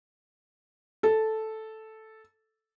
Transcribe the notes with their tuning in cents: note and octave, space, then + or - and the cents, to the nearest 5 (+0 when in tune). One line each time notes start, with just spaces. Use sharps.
A4 -5